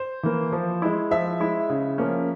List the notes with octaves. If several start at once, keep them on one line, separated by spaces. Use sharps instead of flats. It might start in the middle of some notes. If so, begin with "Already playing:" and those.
Already playing: C5
E3 A#3
F3
G#3 E4
F3 E5
G#3 E4
C#3
F3 A#3 C#4